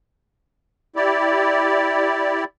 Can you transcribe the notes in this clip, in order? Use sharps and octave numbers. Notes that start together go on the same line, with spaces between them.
E4 G4 D5